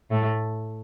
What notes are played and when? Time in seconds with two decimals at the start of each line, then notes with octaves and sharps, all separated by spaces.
0.10 A2 A3